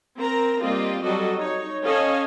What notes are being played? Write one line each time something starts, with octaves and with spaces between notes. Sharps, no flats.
C4 A#4 A#5
G3 A#3 C4 F4 G4 D#5
F#3 G3 F#4 A4 D#5
D#4 C#5
C#4 A4 C#5 D#5 F5 G#5